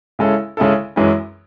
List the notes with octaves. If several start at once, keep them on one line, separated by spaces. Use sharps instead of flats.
C#3 G#3 C#4 E4 A4
C#3 G#3 C#4 E4 A4
F#2 E3 G#3 C#4